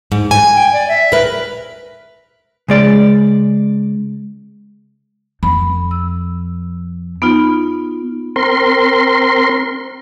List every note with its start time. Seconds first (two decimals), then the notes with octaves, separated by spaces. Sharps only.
0.12 G#2
0.31 G#5
0.54 G5
0.73 D5
0.88 E5
1.12 A#4 B4
2.68 C#3 G#3 D5
5.43 F2 B5
5.91 E6
7.22 B3 D#4 F4
8.36 C4 A#4 C6